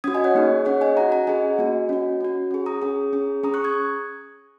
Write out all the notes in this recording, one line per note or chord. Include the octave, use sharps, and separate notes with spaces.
C#4 F#4 D#6 G#6
D#5 G#5
C#5 F#5
A#3 D#4 G#4
C#4 G#4 C#5 F#5
D#5 G#5
C#4 F#4 F#5 A#5
F#5 A#5
C#4 G#4 D#5 G#5
A#3 F#4
C#4 F#4
C#4 F#4
C#4 G#4
A#5 D#6
C#4 G#4
C#4 G#4
C#4 G#4 A#5 D#6
C#6 F#6
D#6 G#6